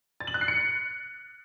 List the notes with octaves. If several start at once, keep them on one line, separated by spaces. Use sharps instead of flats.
A6
F#7
F#6
C7
C#7